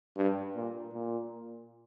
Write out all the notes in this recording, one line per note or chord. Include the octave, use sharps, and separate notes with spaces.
G2
A#2
A#2